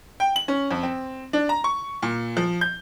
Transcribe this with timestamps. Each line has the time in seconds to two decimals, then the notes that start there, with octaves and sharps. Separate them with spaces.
0.20 G5
0.36 F#7
0.48 C#4
0.71 F2
0.83 C4
1.33 D4
1.49 A#5
1.64 C#6
2.03 A#2
2.37 F3
2.61 G6